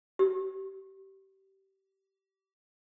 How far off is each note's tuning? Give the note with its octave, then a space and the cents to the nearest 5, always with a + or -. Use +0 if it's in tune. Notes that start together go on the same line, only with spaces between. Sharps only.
G4 -25